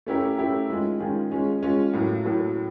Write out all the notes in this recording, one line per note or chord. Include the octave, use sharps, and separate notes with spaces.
A3 C#4 E4 G4 A#4
A3 C#4 E4 G4 A#4
D#3 G#3 C#4 F4 G#4
D#3 G#3 C#4 F4 G#4
G#3 C#4 F4 G#4
G#3 C#4 F4 G#4
A2 F#3 A#3
A2 F#3 A#3